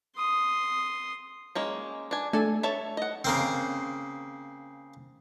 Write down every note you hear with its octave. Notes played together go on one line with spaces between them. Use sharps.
C6 D#6
G#3 A#3 C#4
D4 G#5
A3 D4 A4 G#5
A4 C#5 E5 A5
D#5 F#5
C#3 A#3 C4